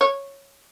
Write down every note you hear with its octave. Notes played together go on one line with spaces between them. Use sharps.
C#5